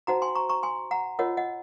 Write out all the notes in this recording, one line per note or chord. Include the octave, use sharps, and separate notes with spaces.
D#4 F#4 C5 F#5 A#5
G#5 C6
A#5 C#6
A#5 C#6
G#5 C6
F#5 A#5
F4 A#4 C#5 D#5 F#5
D#5 F#5